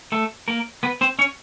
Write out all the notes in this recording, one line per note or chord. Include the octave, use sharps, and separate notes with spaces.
A3 A4
A#3 A#4
B3 B4
C4 C5
C#4 C#5